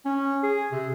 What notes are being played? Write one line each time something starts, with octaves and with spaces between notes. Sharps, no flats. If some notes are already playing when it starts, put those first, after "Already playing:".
C#4
G#4
C3